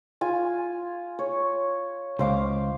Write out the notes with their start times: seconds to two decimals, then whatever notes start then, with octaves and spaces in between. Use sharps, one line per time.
0.21 F4 G#5
1.19 C#5
2.19 C#2 C5 F5 D6